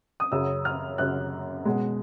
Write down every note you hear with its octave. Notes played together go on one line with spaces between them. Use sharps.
D#6
F#2 C#3 F#3 E6
F6
F#2 C#3 F#3 F#6
B2 G#3